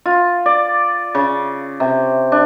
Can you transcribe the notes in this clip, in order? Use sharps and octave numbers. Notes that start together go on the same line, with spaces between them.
F4
D5
C#3
C3
D4